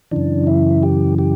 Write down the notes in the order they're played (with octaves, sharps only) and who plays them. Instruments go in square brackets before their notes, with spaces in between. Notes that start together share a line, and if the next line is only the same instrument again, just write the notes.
[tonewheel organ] F#2 C#3 E3 D4
E4
G4
G4